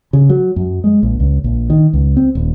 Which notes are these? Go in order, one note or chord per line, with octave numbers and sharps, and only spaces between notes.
C#3
F#3
F#2
G#3
A#1
C#2
A#1
D#3
C#2
C4
D#1